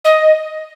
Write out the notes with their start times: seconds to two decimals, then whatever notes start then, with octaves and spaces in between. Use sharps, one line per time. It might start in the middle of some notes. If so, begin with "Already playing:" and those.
0.04 D#5